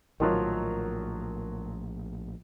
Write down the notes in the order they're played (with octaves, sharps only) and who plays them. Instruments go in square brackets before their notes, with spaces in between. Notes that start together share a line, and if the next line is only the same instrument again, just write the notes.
[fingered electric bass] A#1 A2 [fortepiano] D#3 F3 F#3